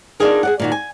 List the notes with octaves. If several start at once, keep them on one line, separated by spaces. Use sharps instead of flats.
B3 D4 D#4 F4 G#4 A#4
G#4 D5 F#5
A#2 D#3 F#4
G#5